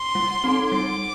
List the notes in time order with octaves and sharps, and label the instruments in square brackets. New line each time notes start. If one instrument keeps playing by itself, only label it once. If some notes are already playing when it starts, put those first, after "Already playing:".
Already playing: [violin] C6
[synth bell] G3
C4 D#4 A4
[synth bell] G3 [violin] D6